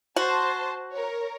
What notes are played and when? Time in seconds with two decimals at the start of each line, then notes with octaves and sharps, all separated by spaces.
0.16 F#4 C5 A5
0.93 A#4 C#5